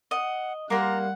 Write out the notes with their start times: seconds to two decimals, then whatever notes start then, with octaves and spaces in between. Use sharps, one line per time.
0.11 D#5 F#5
0.70 G3 A#3 F#5 A#5 C6